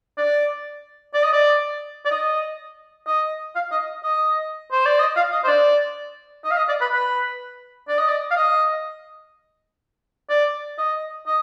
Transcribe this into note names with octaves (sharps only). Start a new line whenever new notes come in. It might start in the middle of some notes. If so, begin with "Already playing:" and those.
D5
D5
D#5
D5
D5
D#5
D#5
F5
D#5
D#5
C5
D5
D#5
F5
D#5
C5
D5
D#5
F5
D#5
D5
B4
B4
D5
D#5
D5
F5
D#5
D5
D#5
D#5